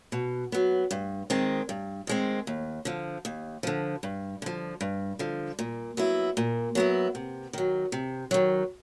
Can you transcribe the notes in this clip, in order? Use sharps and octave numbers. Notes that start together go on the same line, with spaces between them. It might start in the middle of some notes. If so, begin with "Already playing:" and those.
B2
F#3 B3
G2
D#3 G#3 C4
G2
D#3 G#3 C4
D#2
D3 F3
D#2
D3 F3
G2
D3 F3
G2
D3 F3
A#2
F#3 B3 E4
A#2
F#3 B3 E4
C3
D#3 F#3
C3
D#3 F#3